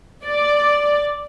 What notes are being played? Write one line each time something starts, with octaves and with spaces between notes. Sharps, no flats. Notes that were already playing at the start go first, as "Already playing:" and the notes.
D5